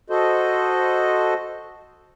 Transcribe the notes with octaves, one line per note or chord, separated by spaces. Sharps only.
F#4 A4 C5 D#5